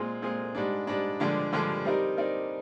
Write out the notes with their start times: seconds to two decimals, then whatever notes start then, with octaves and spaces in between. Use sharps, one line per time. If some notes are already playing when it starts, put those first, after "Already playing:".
Already playing: A#2 G#3 C4 F4 G#4
0.22 A#2 G#3 C4 F4 G#4
0.55 G#2 G3 D4
0.87 G#2 G3 D4
1.20 G2 D3 F3 G#3 D4
1.52 G2 D3 F3 G#3 D4
1.85 G3 C4 D#4 A#4 D5
2.17 G3 C4 D#4 A#4 D5